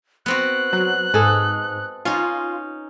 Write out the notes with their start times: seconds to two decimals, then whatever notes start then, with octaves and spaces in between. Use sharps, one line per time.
0.26 B3 C4 F#4 F#6
0.73 F#3
1.14 G#2 G#4 A4 D#5
2.05 C#4 D#4 F4